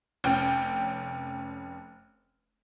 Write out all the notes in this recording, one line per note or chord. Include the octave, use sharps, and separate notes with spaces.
F1 C#4 G5